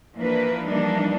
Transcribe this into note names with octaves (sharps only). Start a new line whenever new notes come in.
E3 F3 A#3 D4 A#4 B4
E3 F3 G3 A#3 D4 D#4